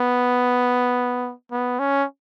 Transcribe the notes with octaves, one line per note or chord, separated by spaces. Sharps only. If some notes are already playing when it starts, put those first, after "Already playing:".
Already playing: B3
B3
C#4